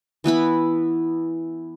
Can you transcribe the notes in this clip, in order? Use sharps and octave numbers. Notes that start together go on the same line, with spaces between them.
E3 B3 E4 B5